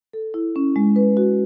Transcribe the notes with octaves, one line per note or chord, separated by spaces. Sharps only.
A4
E4
C#4
G#3
B4
F#4